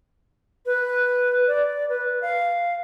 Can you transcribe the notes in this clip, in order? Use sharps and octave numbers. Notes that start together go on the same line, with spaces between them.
B4
D5
B4
F5